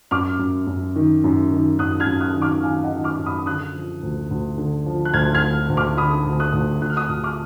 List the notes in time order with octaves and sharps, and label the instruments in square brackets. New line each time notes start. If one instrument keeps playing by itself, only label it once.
[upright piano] F#2 D6 F6
F#2
F#2
D#3
F#2
D#3
F#2 D#6 F#6
F6 G#6
F#2
D#6 F#6
D#3
D6 F6
D#3 F5 G#5
D#5 F#5
D#3
D6 F6
F#2
B5 D#6
D3 D#6 F#6
F3
D2
D2
D3
F3
F#6
D2 F6 G#6
F6 G#6
D2
D2
D6 F6
D3 B5 D#6
D2
D#6 F#6
D2
D2 F#6
F6
D#6 F#6
D2
D6 F6